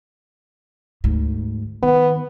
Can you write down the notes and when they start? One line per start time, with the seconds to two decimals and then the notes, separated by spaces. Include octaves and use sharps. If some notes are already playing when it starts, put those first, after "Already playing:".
1.04 D2 G#2
1.83 D#3 B3